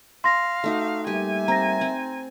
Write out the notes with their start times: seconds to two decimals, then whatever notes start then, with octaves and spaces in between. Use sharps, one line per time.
0.24 F5 C6 A#6
0.64 A3 D#4 F#4
1.07 G3 A#3 G4 E5 G#5
1.48 C4 A#5 A#6
1.81 C4